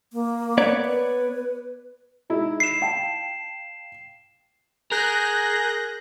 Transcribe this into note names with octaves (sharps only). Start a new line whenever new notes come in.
A#3
B3 C#5 D5
B4
G#3 D#4 E4
C7 E7
F5 G5 A5
G#4 A#4 F#6 G6 A#6